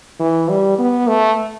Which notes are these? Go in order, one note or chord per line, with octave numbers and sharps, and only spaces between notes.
E3
G3
B3
A3